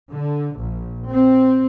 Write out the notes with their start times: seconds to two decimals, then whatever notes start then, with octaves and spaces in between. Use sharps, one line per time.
0.10 D3
0.57 A#1
1.11 C4